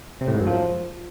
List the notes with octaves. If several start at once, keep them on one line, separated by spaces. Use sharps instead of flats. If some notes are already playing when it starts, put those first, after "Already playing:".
C3
A2
G#2
F#2
F3